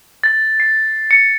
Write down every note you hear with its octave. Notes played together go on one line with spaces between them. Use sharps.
A6
C7
C#7